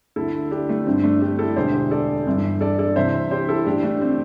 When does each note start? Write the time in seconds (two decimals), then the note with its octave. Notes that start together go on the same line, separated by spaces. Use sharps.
0.16 D2 D3 E4 A4
0.51 D4 G4
0.69 A3
0.86 G1 G2 D3 C4
1.03 A3 D4
1.21 D4 G4
1.38 E4 A4
1.56 E1 D2 D3 G4 C5
1.91 A4 D5
2.27 G1 G2 E3
2.61 A4 D5
2.79 A4 D5
2.96 C2 C3 E3 C5 E5
3.31 G4 C5
3.49 E4 A4
3.66 A1 A2 E3 D4 G4
3.83 A3 D4
4.01 C4